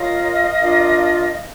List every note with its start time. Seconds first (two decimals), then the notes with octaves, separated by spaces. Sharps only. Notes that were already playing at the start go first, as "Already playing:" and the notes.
Already playing: F4 A#4 C#5 D#5 F5
0.58 D4 F4 A#4